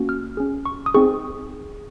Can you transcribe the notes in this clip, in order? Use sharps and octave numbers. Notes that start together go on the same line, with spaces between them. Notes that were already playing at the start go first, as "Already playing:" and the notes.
Already playing: A#3 C#4 F#4
F6
C#4 G#4
C#6
D#6
C4 D#4 G#4 C#6